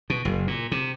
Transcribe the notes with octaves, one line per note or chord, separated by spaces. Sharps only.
B2
F#1
A#2
C3